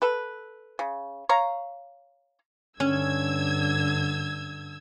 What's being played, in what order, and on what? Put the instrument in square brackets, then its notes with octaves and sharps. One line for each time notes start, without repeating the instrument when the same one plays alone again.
[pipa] A4 B4
C#3
C#5 F5 A#5
[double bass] G2 D3 [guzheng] C#4 [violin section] E6 G#6